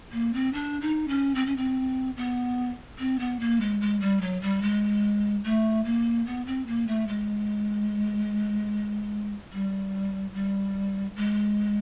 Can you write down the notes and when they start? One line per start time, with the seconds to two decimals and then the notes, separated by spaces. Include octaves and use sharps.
0.12 A#3
0.34 C4
0.53 D4
0.81 D#4
1.08 C#4
1.35 C4
1.46 C#4
1.56 C4
2.17 B3
2.99 C4
3.19 B3
3.40 A#3
3.61 G#3
3.81 G#3
4.01 G3
4.21 F#3
4.42 G3
4.62 G#3
5.44 A3
5.85 A#3
6.26 B3
6.46 C4
6.67 A#3
6.87 A3
7.08 G#3
9.53 G3
10.34 G3
11.16 G#3